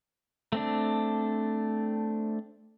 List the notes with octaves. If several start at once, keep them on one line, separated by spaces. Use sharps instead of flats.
A3 C4 D4